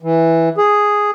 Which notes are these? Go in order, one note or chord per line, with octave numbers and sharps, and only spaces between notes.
E3
G#4